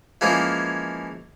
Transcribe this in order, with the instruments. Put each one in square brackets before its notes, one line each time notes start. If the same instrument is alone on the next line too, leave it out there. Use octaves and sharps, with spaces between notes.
[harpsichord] E3 F3 G#3 A#3 C#4 F4